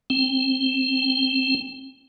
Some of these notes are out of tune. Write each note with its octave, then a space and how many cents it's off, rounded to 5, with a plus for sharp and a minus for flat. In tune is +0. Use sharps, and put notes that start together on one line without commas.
C4 +15